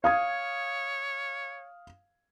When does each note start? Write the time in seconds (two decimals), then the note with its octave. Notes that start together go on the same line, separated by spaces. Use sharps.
0.04 C#5 F5 D#6 G#6